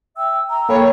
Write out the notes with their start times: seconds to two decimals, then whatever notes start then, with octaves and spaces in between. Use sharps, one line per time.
0.16 E5 G5 E6
0.50 A#5 E6
0.69 A#3 A4 C#5 G5 B5